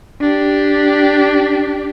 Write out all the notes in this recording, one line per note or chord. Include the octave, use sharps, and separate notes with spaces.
D4 G4